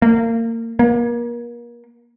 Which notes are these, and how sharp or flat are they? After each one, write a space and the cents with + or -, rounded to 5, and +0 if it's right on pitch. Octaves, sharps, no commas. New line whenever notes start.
A#3 -30
A#3 +35